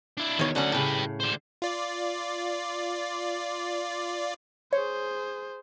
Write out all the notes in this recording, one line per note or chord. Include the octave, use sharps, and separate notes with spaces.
D4 E4
E2 B2 D#3 C#5
D2 D3 F#3 C#4 F#5
A2 C#3 G4 B4
D3 C5
F4 D5
G#4 C5 C#5